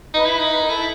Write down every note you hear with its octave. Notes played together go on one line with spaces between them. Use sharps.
D#4 B4
E4
D#4
B4
A#4
E4 A4